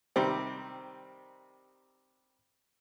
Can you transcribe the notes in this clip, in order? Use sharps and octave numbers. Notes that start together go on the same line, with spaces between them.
C3 D#3 G3 C4